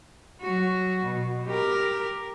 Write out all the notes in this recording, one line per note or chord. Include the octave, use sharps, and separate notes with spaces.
F#3 F#4
B2
G4 A#4